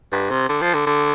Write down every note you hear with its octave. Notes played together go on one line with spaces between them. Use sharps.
G2
C3
D3
F3
D3
D3